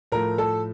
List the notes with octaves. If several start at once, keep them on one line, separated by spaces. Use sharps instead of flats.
A2 F3 A3 A#4 A#5
A4 A5